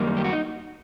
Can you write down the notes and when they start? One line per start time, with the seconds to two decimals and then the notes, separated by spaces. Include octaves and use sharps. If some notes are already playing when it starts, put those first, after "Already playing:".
Already playing: F#2 D#3 G3 A#3 D#4
0.17 G4
0.24 F#4
0.33 D#4